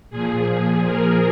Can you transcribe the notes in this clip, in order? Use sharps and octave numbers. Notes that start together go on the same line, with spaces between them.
A#2 F3 G#4
A#4